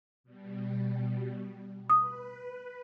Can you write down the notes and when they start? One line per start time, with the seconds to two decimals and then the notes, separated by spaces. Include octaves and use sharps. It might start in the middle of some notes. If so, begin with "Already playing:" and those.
0.24 B2 G3
1.90 B4 D#6